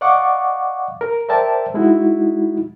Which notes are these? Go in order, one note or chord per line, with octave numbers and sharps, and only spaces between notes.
D5 D#5 F5 F#5 C#6 D6
A#4
A#4 C5 D5 E5 G5 A5
G#3 D#4 E4 F#4